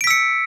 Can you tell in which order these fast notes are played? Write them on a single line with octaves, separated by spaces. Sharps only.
D7 B6 E6 C#7